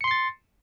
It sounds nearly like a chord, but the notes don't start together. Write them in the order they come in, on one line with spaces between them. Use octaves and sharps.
C#7 C6 C7 A6